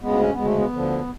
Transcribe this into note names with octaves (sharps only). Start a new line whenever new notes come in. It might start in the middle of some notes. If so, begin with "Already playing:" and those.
D2 C#3 G#3 B3
C#4
D2 C#3 G#3 B3
A3
B3
D2 D3 F3